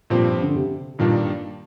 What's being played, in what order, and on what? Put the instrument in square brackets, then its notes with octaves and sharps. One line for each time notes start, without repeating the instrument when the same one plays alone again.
[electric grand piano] G2 F3 C4 G4 C5 [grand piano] A#2
[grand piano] D3
C3
[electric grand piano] G2 D#3 G3 A#3 D4 [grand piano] A#2